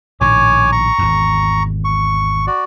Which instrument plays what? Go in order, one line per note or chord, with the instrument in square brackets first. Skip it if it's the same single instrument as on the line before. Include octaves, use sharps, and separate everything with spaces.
[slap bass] A#1 A2 D#3 [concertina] C#5 G#5 D6
[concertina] A#5 C#6
[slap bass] G#1 E2
[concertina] C#6
F#4 D5